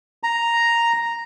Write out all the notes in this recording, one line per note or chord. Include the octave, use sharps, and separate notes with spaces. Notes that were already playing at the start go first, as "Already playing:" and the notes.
A#5